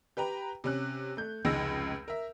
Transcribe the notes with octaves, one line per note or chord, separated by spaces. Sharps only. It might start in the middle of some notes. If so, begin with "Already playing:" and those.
G4 B4 G5 A#5
C3 C#4 F#6
A3 G6
F1 C#2 G#3 D#4 E6 A#6
A#4 E5